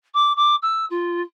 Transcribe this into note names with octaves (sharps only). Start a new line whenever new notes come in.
D6
D6
E6
F4